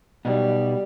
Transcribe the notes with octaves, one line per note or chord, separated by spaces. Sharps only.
B1 B2 G3